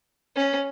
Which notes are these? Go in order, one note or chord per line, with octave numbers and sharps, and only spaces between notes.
C#4